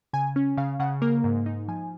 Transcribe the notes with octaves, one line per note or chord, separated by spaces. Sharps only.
C#3 G#5
C#4
C#3 F5
C#3 F#5
A#3 A#4
G#2
D#4
F3 G#5